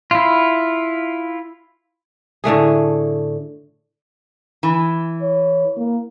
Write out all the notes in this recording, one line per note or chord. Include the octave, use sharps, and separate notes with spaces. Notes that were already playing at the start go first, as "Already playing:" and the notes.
E4 F4
A2 D3 A3 G#4
E3
C#5
A#3